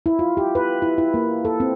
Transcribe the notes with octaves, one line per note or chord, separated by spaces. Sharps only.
E4
F4
G4
B4
E4
E4
A#3
A4
C4